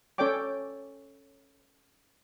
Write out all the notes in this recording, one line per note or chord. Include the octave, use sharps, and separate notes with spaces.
C#4 A4 C#5 D5 G5 D6